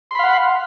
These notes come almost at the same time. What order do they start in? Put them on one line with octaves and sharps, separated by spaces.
C6 B5 F5 F#5